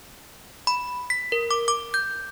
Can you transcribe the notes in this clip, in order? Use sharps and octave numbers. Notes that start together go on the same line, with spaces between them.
B5
B6
A#4
D6
D6
G6